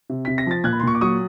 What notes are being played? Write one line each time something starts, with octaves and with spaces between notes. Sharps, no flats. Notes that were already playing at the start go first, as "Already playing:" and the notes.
C3
C3 B6
A#6
F3 A6
A#2 F#6 G#6
B5
C6
A#2 C#6
D6
F#3 C#6 D#6